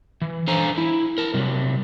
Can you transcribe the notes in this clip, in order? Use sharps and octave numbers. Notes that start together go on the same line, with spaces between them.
E3
D4 A4 C5 F5 G#5 A#5
E4
A#4 A5
C3 F#3 G3